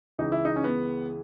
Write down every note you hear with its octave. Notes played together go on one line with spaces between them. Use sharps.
C#2 C#3 E3 D#4
E4
D#4
C#4
B3